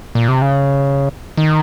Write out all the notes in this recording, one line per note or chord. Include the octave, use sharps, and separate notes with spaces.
A#2
C3
C#3
D#3